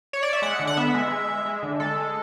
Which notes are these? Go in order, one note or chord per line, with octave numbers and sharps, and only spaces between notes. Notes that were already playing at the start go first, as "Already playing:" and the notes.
C#5
D5
E5
G#3 F#5
D3
F#5
B3 E5
G#3
G#3
G#3
G#3
D3
G#3 A4
G#3